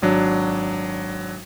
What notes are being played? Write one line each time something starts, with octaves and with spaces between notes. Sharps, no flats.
G#1 F#3 D4